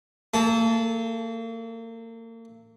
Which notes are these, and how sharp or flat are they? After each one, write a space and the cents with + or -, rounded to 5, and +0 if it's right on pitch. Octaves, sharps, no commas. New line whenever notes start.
A#3 -35 A4 -15